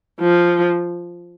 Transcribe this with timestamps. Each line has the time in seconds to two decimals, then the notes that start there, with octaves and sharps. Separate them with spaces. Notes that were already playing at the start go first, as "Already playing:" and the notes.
0.20 F3